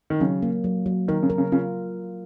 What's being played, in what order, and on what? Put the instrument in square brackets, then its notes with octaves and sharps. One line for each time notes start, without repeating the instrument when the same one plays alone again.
[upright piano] D#3
[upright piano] C#3 [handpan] F#3
[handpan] A#3
F#3
F#3
[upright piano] D#3 [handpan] A#4
[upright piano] C#3
[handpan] A#4
[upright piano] C#3
[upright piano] C#3 [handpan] F4